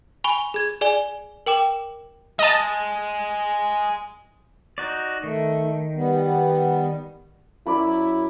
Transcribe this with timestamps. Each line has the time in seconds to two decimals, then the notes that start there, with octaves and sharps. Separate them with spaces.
0.24 G#5 B5 C#6 G7
0.54 G#4 G#6
0.81 G#4 D5 G#5 G7
1.46 A#4 G5 D6 E7
2.39 G#3 D#5 A5
4.78 D#4 F#4 D5
5.24 D#3 A3
5.95 G3 B3
7.66 F#2 E4 D5 B5